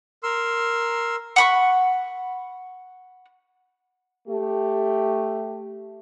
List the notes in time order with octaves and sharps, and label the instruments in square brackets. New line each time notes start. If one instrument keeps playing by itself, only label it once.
[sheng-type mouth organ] A#4 C6 E6
[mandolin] F#5 B5 C#6
[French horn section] A3 G4